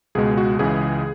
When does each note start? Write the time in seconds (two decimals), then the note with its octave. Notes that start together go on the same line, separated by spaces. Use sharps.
0.15 C#2 B2 G#3 G#4
0.37 F#4
0.59 C#2 C#3 E3 G#3 G#4